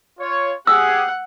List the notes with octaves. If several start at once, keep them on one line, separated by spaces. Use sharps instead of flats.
F4 C#5
G4 G#4 F#5 E6